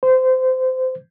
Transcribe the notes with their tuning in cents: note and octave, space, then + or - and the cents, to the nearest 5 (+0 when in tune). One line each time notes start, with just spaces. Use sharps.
C5 -20